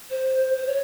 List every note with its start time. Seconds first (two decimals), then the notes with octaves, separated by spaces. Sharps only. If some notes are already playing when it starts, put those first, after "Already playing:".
0.10 C5
0.55 C5
0.67 C#5